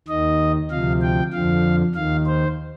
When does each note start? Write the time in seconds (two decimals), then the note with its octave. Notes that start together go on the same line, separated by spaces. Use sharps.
0.08 D#2 D#3 D#5
0.71 D2 C3 F3 F5
1.02 G5
1.33 F2 D3 F3 F5
1.95 D#2 D#3 F5
2.26 C5